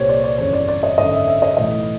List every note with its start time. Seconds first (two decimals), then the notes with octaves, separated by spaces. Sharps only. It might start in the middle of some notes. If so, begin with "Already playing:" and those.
Already playing: C2 A#2 G4 C5 C#5
0.09 D5
0.24 D5
0.38 G1 F2 C#3 E3 C#5
0.53 D5
0.68 D5
0.83 D#5
0.98 G#1 F#2 D3 D#5
1.13 E5
1.28 E5
1.42 D#5
1.57 B1 A2 E3 D#5